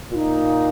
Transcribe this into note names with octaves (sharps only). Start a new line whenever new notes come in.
A#2 D#4 F4